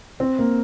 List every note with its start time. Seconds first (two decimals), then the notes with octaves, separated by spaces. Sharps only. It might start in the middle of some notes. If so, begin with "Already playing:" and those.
0.20 C4
0.39 A#3